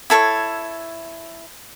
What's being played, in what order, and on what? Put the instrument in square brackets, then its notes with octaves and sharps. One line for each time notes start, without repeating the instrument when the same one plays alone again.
[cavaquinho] E4 A4 B4 C#5